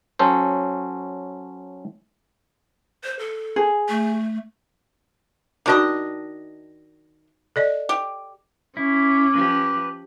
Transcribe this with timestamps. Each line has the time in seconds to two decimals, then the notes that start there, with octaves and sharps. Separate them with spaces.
0.19 F#3 C#4 A4 C5
3.04 C5
3.19 A4
3.56 G#4
3.89 A3
5.66 D#3 D4 D#4 F#4 D#5 D6
7.56 A4 D5 D#5
7.89 G4
8.77 C#4 E4 D6
9.34 F3 G4 B4